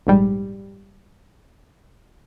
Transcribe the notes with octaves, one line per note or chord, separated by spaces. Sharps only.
A#1 G#2 G3